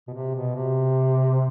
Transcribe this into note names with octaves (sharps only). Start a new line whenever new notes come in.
B2
C3
B2
C3